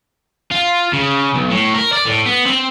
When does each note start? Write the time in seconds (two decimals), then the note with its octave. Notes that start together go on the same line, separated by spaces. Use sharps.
0.51 F4
0.93 C#3
1.35 B1
1.51 A2
1.74 A#4
1.93 D5
2.06 A2
2.26 B3
2.46 C4